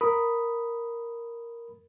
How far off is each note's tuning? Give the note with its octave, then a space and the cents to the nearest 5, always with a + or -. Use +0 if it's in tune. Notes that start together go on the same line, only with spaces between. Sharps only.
A#4 +0 B5 +0 D#6 +0